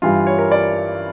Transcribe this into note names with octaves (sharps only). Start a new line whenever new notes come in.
G2 E3 G3 F4
C#5
A#4
D5